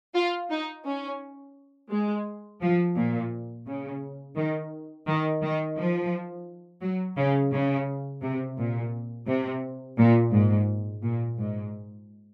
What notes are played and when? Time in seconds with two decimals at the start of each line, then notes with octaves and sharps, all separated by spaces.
0.15 F4
0.51 D#4
0.85 C#4
1.90 G#3
2.61 F3
2.96 A#2
3.66 C#3
4.36 D#3
5.07 D#3
5.42 D#3
5.76 F3
6.81 F#3
7.17 C#3
7.52 C#3
8.22 C3
8.57 A#2
9.27 C3
9.98 A#2
10.32 G#2
11.02 A#2
11.38 G#2